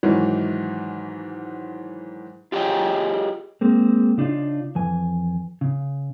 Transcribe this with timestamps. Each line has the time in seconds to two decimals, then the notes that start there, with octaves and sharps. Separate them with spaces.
0.03 G#2 D#3 E3 F#3
2.52 F4 G4 G#4 C#5 D#5 G5
3.61 G#3 A#3 C4
4.17 C#3 D4 D#4 F4
4.75 F2 E3 G#5
5.61 C#3